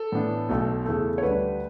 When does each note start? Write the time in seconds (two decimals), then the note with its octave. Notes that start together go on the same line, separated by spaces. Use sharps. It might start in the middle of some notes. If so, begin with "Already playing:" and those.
Already playing: A4
0.12 A2 E3 B3 D4
0.49 B1 B2 A3
0.86 E2 C#3 E3 A3
1.18 C#5
1.23 D2 D3 G3 D4 B4